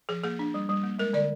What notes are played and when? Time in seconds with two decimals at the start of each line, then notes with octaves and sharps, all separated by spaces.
0.09 F3 G#4
0.24 A#3 G#4
0.39 D4
0.54 G3
0.69 G3
0.83 A#3
0.99 G#3 A#4
1.13 D3 D5